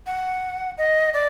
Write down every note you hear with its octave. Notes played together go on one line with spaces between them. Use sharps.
F#5
D#5
D5